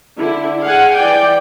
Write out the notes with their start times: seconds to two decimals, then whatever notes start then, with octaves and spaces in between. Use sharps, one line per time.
0.19 D3 E4
0.63 G#4 F5 F#5 G#5
0.95 E3 D5 G5